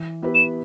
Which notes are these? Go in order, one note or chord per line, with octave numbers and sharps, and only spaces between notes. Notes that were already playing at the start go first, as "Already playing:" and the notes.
Already playing: E3
B3 E4 G4 B4
E7